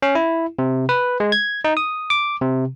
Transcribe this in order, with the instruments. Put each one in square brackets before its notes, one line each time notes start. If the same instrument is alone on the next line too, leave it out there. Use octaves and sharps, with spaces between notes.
[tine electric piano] C#4
E4
C3
B4
G#3
G#6
D#4
D#6
D6
C3